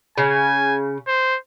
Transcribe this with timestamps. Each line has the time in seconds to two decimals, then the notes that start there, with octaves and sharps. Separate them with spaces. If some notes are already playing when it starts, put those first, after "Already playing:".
0.18 C#3 G#5
1.08 C5